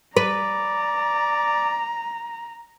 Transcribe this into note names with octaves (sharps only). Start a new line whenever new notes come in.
B4 D5 A#5